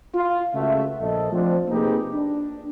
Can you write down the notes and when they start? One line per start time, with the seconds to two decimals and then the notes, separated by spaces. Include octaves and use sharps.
0.14 F4
0.54 C#2 C#3 A3 F#4 E5
1.01 A#1 A4 D#5
1.32 F3 A3 C4 D4 F4 C5
1.69 C3 A#3 D#4 G4 G#4 B4
2.14 D4